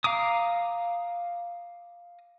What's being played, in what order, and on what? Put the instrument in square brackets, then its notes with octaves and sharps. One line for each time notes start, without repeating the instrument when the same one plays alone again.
[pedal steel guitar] F5 A#5 D6 D#6